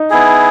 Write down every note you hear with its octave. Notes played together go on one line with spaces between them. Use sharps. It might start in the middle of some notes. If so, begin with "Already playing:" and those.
Already playing: D#4
B3 E4 G#4